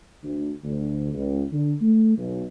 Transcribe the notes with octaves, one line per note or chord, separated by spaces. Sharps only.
D2
D2
C#2
D3
A3
B1